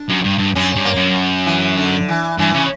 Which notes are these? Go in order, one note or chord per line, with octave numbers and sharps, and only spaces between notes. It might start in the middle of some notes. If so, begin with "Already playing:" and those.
Already playing: D4
F#2
G2
G2
F#2 C#4
G2
A#3
F#2
E3
D3
E3
G2 E3
C#3